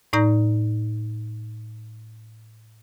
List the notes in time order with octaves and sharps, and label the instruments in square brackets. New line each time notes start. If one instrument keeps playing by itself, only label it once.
[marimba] A2 D#4 D5 A#5 G6 A#6